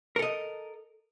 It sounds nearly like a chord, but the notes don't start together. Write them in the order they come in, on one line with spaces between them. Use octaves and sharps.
A#4 A4 D#5